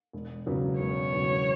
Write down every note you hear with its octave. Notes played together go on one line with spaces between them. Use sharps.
E1
E2 C#3 F#3 B3
E1 C#5
E2 C#3 F#3 B3